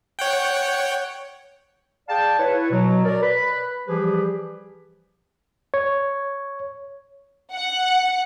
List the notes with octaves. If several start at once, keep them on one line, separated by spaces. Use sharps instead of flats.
C#5 F#5 G5
G#4 D5 F5 G5 A5
E4 B4 C#5
B2 F#3
A#4 D5
B4 B5
E3 F3 G3 G4 G#4 B4
C#5
F#5